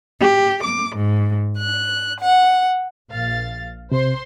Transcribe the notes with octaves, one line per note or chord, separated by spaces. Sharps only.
G4
D6
G#2
F#6
F#5
A#1 F5 A6
C3 C5 C6